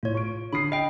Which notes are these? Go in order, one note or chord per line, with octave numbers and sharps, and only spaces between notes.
A2 F4 C#5
C#6 D7
D3 B5 D#6 C7
D#5 G5 C7